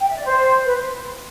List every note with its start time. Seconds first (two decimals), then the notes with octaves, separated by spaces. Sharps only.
0.01 G5
0.09 E5
0.17 D5
0.26 C5
0.65 B4